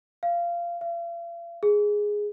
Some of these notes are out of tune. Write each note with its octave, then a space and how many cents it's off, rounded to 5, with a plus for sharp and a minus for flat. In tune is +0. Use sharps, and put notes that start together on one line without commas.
F5 -20
F5 -40
G#4 +0